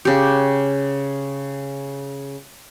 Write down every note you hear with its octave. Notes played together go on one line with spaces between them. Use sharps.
C#3 G4